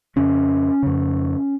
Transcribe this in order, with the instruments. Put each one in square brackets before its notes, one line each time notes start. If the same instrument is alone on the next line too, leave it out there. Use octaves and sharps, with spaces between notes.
[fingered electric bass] F2 C#3 C#4
F2 C#3